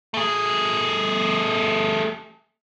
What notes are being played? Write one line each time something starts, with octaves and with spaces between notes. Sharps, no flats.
A3 G#4